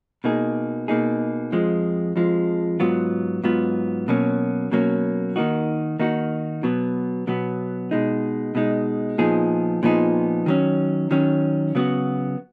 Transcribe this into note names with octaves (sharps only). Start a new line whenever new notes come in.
B2 A#3 D#4 G#4
B2 A#3 D#4 G#4
F2 F3 G#3
F2 F3 G#3
G#2 F#3 B3 F4
G#2 F#3 B3 F4
B2 F#3 A#3 C#4
B2 F#3 A#3 C#4
D#3 A#3 D#4 F#4
D#3 A#3 D#4 F#4
B2 F#3 B3
B2 F#3 B3
B2 G#3 D#4
B2 G#3 D#4
A#2 F3 B3 D#4 G#4
A#2 F3 B3 D#4 G#4
D#3 F#3 C#4
D#3 F#3 C#4
C#3 F#3 B3 F#4